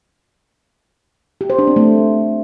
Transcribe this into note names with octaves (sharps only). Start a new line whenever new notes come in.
G4
C5
D4
C4
A3